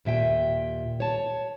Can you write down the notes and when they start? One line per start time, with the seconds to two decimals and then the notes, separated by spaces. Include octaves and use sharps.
0.05 D#2 A#2 E5 G5
1.00 C#5 A5